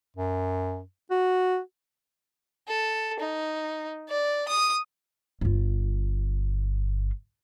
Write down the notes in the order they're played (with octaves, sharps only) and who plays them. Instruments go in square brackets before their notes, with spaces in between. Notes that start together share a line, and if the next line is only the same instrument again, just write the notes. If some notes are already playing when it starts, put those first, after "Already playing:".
[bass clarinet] F#2
F#4
[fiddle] A4
D#4
D5
D#6
[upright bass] G1 F4